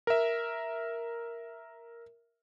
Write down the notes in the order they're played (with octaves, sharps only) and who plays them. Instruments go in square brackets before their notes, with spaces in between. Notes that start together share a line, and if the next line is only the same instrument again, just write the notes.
[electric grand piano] A#4 E5